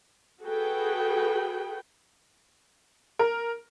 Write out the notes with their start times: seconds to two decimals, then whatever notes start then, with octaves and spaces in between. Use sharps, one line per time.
0.43 F#4 G#4 A4 B4 G5
3.19 A#4